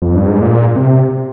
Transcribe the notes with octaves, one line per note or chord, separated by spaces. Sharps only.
F2
G2
G#2
A#2
C3